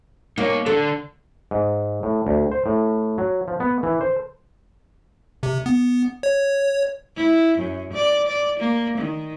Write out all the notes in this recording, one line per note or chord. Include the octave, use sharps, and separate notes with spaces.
A#3 D#4 C#5
D3 D4 A4
G#2
A2
D2
C5
A2
F#3
F3
B3
E3
C5
C3
B3
C#5
E4
F#2
D5
D5
A#3
D#3